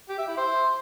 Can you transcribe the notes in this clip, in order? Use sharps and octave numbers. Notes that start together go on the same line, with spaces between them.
G4
E5
E4
C5